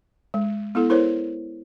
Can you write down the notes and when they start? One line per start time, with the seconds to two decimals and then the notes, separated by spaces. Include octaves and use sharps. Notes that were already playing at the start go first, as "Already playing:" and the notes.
0.34 G#3
0.75 B3 E4 A4
0.90 E4 A#4 C5 C#5